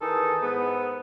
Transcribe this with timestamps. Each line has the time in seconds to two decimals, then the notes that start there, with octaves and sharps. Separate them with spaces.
0.01 D#3 E3 D#4 G#4 A4
0.41 G#2 G#3 B3